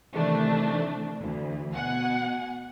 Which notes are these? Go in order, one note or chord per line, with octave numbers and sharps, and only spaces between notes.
C3 D#3 E3 A3 D4
D2 E3
B2 F#5 G#5